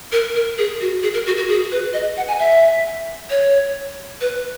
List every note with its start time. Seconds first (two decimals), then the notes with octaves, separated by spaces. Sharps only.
0.12 A#4
0.35 A#4
0.58 G#4
0.81 F#4
1.03 G#4
1.14 A#4
1.27 F#4
1.37 F#4
1.49 G#4
1.72 B4
1.93 D#5
2.17 F#5
2.28 G#5
2.39 E5
3.30 C#5
4.21 B4